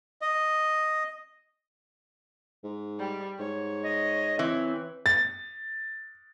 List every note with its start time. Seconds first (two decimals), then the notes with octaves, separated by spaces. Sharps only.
0.22 D#5
2.64 G#2
2.99 G3
3.39 G#2 C#5
3.83 D#5
4.39 E3 C4
5.06 A6